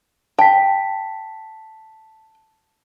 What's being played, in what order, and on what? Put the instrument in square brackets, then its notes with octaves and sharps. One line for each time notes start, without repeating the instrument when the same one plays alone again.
[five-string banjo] G5 [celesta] A5 B6